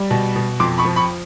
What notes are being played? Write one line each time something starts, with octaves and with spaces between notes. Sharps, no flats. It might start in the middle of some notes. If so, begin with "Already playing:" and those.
Already playing: G3
B2
B2
F2 C6 D6
B5 C#6
F3
B5 C#6